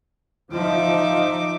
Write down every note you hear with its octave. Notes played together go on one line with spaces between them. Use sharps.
F3 D#4 E5 D6